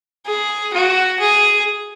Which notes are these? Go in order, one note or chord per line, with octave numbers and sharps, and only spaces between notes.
G#4
F#4
G#4